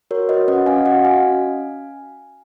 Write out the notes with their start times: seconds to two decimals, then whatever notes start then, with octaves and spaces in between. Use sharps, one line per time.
0.11 F#4 A#4 C#5
0.29 F#4 B4 D#5
0.48 C#4 D#5 F#5
0.66 C#4 F5 G#5
0.85 F#4 D#5 F#5
1.04 F#4 F5 G#5
1.23 C#4